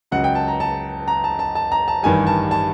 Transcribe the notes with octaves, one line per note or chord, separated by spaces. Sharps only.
C#2 C#3 F#3 F#5
G5
A5
A#5
A5
A#5
A5
A5
A5
A#5
A5
A1 G2 D#3 G3 G#5
A5
A5